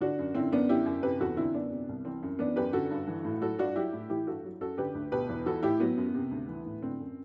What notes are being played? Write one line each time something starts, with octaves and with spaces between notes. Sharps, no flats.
D3 D4 F#4
F#2
D3 C4 E4
F#2 B3 D4
D3 E4 G4
F#2
C3 G4 B4
E2 F#4 A4
D3 C4 E4
F#2 B3 D4
C3
C2
E3 C4
F#2
E3 B3 D4
F#2 G4 B4
D3 F#4 A4
G2
E3
A2
F#3 F#4 A4
G2 D4 F#4
F#3 E4 G4
A2
E3 E4 G4
G2 F#4 A4
F#3
F#2 F#4 A4
D3 G4 B4
D2
B2 G4 B4
E2
E3 F#4 A4
A2 E4 G4
F#3 B3
F#2
C3
D2
E3
A2
D3 C4
F#2